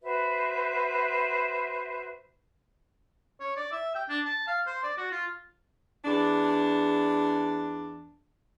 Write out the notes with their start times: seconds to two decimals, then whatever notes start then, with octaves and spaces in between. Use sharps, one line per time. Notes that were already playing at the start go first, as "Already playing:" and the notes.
0.02 F#4 B4 C5 E5
3.40 C#5
3.57 D5
3.72 E5
3.95 G5
4.09 D4
4.25 A5
4.47 F5
4.67 C5
4.84 D5
4.98 F#4
5.12 F4
6.04 E2 D4